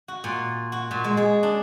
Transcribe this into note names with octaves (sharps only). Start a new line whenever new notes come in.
F#4
A#2
F#4
A#2
G#3
G#4
D4